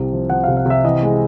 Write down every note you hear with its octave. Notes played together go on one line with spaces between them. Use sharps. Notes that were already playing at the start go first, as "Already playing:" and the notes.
Already playing: C2 C3
F3
F3 F#5
F5
C3
F5
C3 E5
E3 D#5
G#3